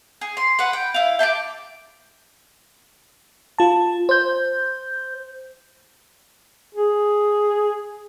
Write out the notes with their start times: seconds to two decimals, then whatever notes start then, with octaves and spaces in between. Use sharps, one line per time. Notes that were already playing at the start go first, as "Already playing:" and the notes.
0.21 G#4
0.37 C6
0.59 B4 F#5
0.73 G5
0.94 E4 F5
1.19 G5 A5 B5 D6
3.59 F4 A5
4.09 C5 G6
6.75 G#4